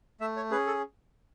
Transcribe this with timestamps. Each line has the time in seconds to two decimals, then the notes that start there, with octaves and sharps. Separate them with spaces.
0.21 A3 E5
0.36 C#5
0.51 C#4 G#4 B4
0.67 A4